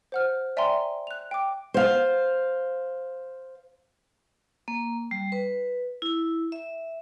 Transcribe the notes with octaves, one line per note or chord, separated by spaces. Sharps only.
C5 F#5 F6
D5 E5 G5 G#5 A#5 C6
F#6 F7
G5 D6
C5 F5
A#3
G3
B4
E4
E5